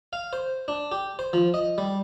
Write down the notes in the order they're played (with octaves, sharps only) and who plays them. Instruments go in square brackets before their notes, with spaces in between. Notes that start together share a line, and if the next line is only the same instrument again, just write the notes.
[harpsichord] F5
C5
D4
G4
C5
F3
D#5
G3